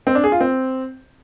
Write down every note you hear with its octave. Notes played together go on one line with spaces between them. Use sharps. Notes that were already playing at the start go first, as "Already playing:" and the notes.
C4
D4
G#4
F4
C4